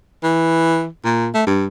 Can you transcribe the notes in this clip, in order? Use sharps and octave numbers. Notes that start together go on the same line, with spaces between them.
E3
A#2
A3
G2